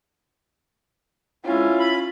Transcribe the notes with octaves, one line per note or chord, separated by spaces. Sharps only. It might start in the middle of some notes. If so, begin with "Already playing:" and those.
G#2 C#4 E4 F4
B5